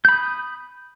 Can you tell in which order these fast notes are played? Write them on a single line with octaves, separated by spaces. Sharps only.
G6 B5 D#6